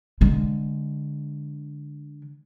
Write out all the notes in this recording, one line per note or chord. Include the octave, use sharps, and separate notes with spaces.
D3 G#3